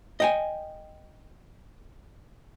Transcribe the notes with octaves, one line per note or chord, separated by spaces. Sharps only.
D#5 G5 G#5